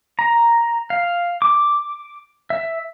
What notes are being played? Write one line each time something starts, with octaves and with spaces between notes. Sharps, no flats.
A#5
F5
D6
E5